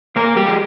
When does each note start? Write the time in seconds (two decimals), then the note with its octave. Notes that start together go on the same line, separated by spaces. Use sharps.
0.16 A#2 A#3 A#4
0.36 G3 G4
0.46 F3 G#3